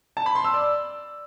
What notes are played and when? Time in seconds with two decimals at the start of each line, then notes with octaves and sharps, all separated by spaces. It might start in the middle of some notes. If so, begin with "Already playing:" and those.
0.17 A5
0.26 B5
0.35 C6
0.45 E6
0.54 D5